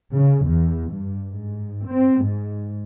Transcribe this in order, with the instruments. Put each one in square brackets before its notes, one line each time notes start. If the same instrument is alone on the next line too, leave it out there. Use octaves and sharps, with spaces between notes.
[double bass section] C#3
E2
G2
G#2
C4
G#2